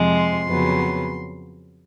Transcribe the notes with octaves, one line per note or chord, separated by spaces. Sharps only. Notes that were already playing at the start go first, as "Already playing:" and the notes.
Already playing: F2 C3 F3 G#3
C6
F2 C#3 F#3 B3